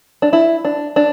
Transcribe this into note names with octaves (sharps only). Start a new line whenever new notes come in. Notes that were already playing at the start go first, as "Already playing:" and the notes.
D4
E4
D4
D4